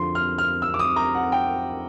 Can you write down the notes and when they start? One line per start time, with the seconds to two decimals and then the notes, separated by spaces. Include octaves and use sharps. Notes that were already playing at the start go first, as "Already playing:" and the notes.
Already playing: F2 D3 F3 C6
0.15 F6
0.38 F6
0.62 E6
0.74 D6
0.79 D#6
0.96 A#5
1.15 F#5
1.32 G5